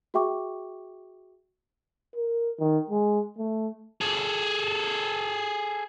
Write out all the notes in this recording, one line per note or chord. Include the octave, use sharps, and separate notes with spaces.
F#4 G#4 E5 G5 C#6 D6
A#4
D#3
G#3
A3
G#4 A4